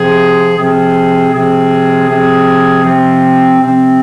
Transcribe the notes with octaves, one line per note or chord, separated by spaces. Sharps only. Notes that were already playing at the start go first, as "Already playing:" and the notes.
Already playing: C3 F3 C4 G#4
C3 F3 C4 G#4
C3 F3 C4 G#4
C3 F3 C4 G#4
C3 F3 C4
C3 F3 C4